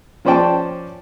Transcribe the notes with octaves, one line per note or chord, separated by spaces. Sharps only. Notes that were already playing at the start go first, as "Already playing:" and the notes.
F3 C#4 C5 D5 G5 A5